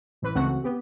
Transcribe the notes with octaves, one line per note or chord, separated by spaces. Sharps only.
A1 E3 B4
C#2 E3 A3 C4 F#4 F#5
B3 G4